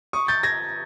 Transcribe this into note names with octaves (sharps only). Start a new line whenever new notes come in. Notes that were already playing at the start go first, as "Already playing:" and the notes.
C#6 D#6
G6 A6
G#6 A#6